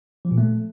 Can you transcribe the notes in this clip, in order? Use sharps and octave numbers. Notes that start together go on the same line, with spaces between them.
F3
A#2
A3